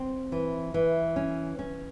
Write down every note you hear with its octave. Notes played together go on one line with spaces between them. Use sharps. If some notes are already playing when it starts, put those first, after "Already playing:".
Already playing: C4
E3
E3
C#4
C#4